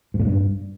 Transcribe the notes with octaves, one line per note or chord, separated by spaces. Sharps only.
G#2
A#2
G2